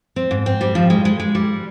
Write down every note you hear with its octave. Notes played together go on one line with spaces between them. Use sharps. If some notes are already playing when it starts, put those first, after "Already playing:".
C4
G#2
C4
G3
F3
G#3
G#3
G#3
G3